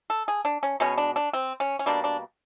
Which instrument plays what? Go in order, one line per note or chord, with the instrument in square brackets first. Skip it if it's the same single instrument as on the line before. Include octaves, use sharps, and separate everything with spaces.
[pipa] A4
G#4
D4
C#4
B2 G#3 B3 C#4
D4
D4
C4
C#4
C#4
B2 G3 A#3 D4
D4